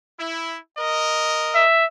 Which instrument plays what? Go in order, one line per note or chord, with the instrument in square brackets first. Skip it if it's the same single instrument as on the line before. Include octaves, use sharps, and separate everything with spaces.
[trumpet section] E4
A#4 D#5
[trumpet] E5